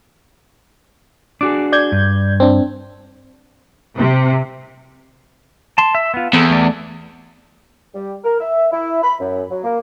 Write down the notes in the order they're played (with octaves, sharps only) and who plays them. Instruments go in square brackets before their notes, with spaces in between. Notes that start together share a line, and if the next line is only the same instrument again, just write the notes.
[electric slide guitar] D4 F#4 G#4 [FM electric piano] D6
[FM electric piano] D5 G6 G#6
[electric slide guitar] G2
[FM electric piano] C4 D4
[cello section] C3
[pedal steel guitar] A5 C6
E5
B3 F4
[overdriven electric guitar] E2 [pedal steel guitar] B3 C4 A4
[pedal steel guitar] A3 D5
[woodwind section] G3
A#4
E5
E4
B5
F#2
F#3
A#3